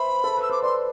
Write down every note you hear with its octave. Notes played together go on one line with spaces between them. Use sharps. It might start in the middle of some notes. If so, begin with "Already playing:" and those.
Already playing: B4 C5 E5 B5
A4
B4 E6
C5 D6
B4 D5 C6